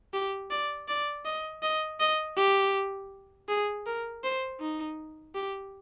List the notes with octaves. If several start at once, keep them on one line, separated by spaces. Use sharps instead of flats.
G4
D5
D5
D#5
D#5
D#5
G4
G#4
A#4
C5
D#4
G4